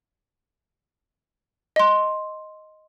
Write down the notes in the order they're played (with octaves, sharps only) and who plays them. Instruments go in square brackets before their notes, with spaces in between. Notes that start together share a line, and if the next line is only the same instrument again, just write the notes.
[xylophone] D#5 C6